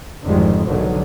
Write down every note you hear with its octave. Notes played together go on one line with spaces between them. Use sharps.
G#1 F2 D3 D#3 G3 G#3
F1 B1 G#2 D3 D#3 F#3